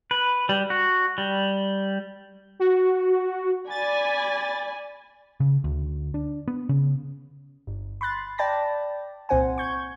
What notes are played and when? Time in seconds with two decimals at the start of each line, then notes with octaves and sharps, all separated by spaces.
0.11 B4
0.49 G3
0.70 F#4
1.18 G3
2.60 F#4
3.70 D5 G#5 B5 A6
5.40 C#3
5.64 D2
6.14 D4
6.48 B3
6.69 C#3
7.67 G1
8.01 B5 C6 F#6 A6
8.38 D5 G5 A5 B5 A6 A#6
9.29 C2 A#2 C4 C5 F#5 G#5
9.58 C#6 G6 G#6